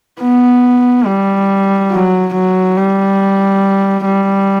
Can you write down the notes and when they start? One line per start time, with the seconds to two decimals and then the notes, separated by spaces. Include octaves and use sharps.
0.20 B3
1.06 G3
1.91 F#3
2.34 F#3
2.77 G3
4.05 G3